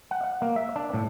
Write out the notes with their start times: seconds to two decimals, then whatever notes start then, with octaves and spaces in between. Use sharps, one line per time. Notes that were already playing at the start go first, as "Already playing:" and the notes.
0.11 F#5
0.24 F#5
0.42 A#3
0.56 E5
0.76 D4
0.94 A2